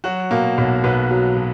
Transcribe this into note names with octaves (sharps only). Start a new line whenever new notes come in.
F#3 F#4
B2 A#3
B1
B1 B3
F#3
B2